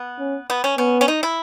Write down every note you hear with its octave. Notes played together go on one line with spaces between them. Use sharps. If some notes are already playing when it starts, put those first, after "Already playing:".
Already playing: B3
C#4
B3
C#4
B3 C#4
C#4
D#4
E4